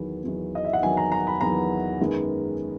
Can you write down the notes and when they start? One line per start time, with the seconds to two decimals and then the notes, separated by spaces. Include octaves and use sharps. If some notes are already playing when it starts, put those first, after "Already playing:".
Already playing: E2 D#3 F#3 B3
0.24 E2 D#3 F#3 B3
0.55 D#5
0.64 E5
0.73 F#5
0.82 E2 D#3 F#3 B3 G#5
0.97 A#5
1.12 A#5
1.27 B5
1.41 E2 D#3 F#3 B3 A#5
1.99 F#2 D#3 G#3 B3